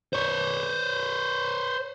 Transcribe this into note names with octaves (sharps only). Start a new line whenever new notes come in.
C5 C#5